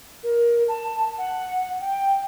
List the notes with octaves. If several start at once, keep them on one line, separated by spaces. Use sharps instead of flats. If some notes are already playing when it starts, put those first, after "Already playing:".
A#4
A5
F#5
G5